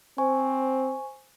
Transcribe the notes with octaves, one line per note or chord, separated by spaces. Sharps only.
C4 C5 G#5 C#6